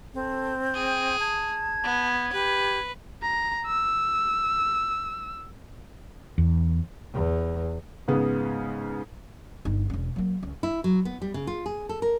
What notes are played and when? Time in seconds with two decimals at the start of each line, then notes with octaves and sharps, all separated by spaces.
0.14 C4 A4
0.74 G#4 G5
1.20 A5 G#6
1.84 B3
2.33 G4 B4
3.22 A#5
3.66 E6
6.38 E2
7.13 E2
8.08 G#2 C#3 B3 G#4
9.65 G1 D#4
9.90 E1 C#4
10.16 F#3 A#3
10.43 C#2
10.63 E4
10.84 F#3
11.05 B3
11.22 G3
11.34 C#3
11.47 F4
11.66 G#4
11.89 A4
12.02 A#4